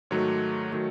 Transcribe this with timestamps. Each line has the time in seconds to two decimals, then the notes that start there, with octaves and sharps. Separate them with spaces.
0.11 G#2 D#3 F#3 A3 C#5
0.72 D#3 F#3 A3